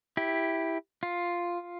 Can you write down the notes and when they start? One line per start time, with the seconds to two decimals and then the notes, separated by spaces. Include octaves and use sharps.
0.17 E4 G4
1.03 F4